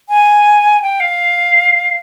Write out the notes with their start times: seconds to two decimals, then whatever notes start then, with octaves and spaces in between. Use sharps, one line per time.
0.09 G#5
0.82 G5
1.00 F5